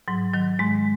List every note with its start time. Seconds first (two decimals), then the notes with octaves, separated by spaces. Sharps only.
0.08 G#2 F#3
0.34 D#3 F#3
0.59 G#2 G#3